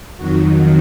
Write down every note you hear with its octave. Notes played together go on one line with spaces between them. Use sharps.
F2 D#3 F#3 F#4